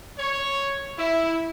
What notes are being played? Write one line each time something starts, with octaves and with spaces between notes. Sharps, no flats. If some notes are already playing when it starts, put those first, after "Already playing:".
C#5
E4